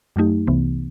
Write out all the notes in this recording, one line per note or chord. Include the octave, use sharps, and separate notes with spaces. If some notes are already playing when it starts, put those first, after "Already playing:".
F#2 F#3 A3 D#4 G4
C2 C3 E3 B3